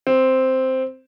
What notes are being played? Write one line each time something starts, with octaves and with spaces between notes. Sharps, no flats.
C4